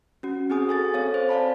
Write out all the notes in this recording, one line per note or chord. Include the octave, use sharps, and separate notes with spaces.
C#4 F#4
C4 F#4 G#4 G#5 D#6
A4 G#5 A6
C4 A4 C#5 F5 A6
C5
D5 F5 A5 B5